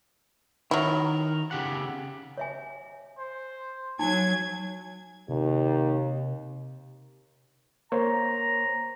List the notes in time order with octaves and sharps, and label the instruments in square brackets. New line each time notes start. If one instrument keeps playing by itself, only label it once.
[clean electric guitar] D#3 A#4 [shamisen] F#3 E4
[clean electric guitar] C#3 G4 F#5
[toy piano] C#5 E5 G#5
[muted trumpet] C5
[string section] F#3 G#6 [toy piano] D#4 [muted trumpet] G#5
[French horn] D#2 [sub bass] C3
[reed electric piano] A#3 C5 C#5 [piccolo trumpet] A#5